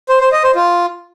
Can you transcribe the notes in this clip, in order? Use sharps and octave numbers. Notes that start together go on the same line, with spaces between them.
C5
C5
D#5
C5
F4